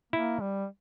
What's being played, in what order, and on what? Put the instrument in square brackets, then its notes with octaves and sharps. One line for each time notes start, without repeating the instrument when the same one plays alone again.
[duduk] A#3 [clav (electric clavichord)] E4
[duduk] G3